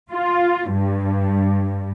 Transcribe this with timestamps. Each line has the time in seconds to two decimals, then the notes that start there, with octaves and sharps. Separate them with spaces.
0.10 F4
0.70 G2